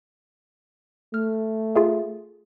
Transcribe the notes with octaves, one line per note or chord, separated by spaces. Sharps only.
A3 F6
F4 G#4 E5